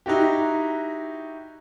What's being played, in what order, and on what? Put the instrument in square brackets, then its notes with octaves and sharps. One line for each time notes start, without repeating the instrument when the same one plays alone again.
[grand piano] D#4 E4 F#4 G4